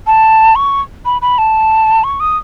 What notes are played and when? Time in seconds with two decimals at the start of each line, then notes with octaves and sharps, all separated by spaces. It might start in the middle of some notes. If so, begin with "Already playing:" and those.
0.07 A5
0.56 C#6
1.05 B5
1.22 B5
1.38 A5
2.04 C#6
2.20 D#6